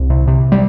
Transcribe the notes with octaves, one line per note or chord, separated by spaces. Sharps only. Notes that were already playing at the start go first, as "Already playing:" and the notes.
Already playing: C2
C3
C3
G3